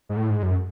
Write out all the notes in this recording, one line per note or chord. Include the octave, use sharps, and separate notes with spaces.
G#2
A2
G#2
F#2